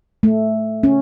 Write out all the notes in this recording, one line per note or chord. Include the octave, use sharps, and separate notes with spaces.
A3
C#4